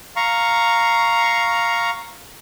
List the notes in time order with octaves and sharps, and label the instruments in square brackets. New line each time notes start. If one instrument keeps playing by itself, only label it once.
[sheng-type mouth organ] F5 A#5 C#6